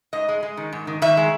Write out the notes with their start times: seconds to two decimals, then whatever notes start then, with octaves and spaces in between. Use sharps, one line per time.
0.13 G#2 D#5
0.28 G#3
0.43 G#3
0.57 D#3
0.73 G#2
0.87 D#3
1.02 D#3 E5
1.17 G#3